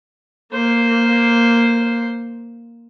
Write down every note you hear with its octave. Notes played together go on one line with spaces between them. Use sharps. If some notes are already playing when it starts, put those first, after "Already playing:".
A#3 C5